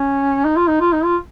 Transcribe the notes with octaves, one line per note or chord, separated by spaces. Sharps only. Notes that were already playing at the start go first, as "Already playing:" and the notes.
Already playing: C#4
D#4
F4
D#4
F4
D#4
F4